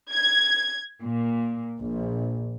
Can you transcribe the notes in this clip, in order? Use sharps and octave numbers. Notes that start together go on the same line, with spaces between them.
G#6
A#2
A#1